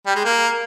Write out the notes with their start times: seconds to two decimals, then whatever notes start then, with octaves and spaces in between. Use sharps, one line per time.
0.07 G3
0.16 G#3
0.25 A#3